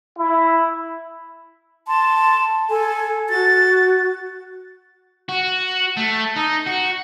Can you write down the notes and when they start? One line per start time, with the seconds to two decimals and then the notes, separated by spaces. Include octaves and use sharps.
0.18 E4
1.88 A5 C6
2.70 A4 G#5
3.29 F#4 A6
5.29 F#4
5.97 A3
6.36 D#4
6.67 F#4